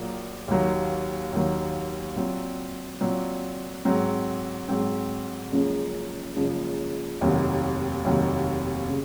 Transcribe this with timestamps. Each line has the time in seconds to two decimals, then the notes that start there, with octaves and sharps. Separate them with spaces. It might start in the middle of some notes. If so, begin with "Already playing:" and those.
Already playing: A#1 A#2 F#3 A#3
0.48 D#2 D#3 F#3
1.33 D#2 D#3 F#3
2.16 A#2 F#3 C4
3.00 A#2 F#3 C4
3.85 G#2 F#3 C4
4.69 G#2 F#3 C4
5.52 F#1 F#2 C#3 F3 G#3
6.36 F#1 F#2 C#3 F3 G#3
7.21 F1 D#2 D#3 F#3
8.04 F1 D#2 D#3 F#3
8.89 C#3